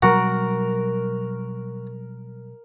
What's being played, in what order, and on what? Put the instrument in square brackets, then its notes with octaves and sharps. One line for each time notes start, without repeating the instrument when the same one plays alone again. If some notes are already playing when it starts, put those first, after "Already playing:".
[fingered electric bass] B2 F#3 G3 [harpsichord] F#4 [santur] A#4